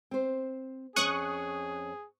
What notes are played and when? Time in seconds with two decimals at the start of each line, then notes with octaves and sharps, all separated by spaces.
0.11 C4 C5
0.96 F2 C#4 G#4 C#5 C#6 D#6 F#6